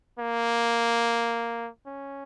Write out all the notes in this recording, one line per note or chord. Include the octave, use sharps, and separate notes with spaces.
A#3
C#4